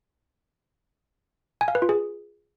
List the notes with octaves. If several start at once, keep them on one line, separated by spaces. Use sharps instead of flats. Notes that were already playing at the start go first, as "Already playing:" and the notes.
G#5
F5
B4
F4
G#4